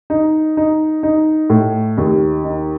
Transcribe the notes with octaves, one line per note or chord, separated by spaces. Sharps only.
D#4
D#4
D#4
A2
D#2
D#4